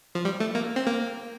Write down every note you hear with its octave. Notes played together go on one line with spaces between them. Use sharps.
F3
G3
A3
A#3
C4
A#3